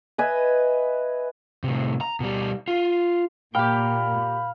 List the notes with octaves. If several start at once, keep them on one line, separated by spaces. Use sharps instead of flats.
B4 D#5 E5 G#5
A2 C3
A#5
B2 G3
F4
A#2 G4 F5 G5 B5